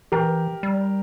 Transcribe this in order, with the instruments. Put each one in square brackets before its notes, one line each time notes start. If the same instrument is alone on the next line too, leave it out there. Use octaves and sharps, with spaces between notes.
[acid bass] E3 [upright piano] G4 A#4
[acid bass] G3